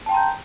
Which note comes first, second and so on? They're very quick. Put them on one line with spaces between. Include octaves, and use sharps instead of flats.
A5 G5 C6 A#5 G6